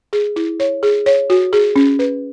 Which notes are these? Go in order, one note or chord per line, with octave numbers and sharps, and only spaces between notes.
G#4
E4
C#5
G#4
C#5
F#4
G#4
C#4
B4